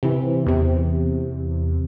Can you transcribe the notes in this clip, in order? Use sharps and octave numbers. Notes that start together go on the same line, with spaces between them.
C3 E3
E2 C3